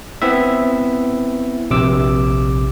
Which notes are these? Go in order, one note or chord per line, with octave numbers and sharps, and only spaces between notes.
B3 C4 E4 E5
A#1 C3 D6 E6